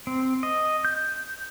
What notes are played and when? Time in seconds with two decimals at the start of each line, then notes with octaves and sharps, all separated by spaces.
0.07 C4
0.43 D#5
0.85 G6